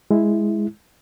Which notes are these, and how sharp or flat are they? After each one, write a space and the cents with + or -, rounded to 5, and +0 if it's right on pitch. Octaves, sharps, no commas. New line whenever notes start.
G#3 +0 E4 +0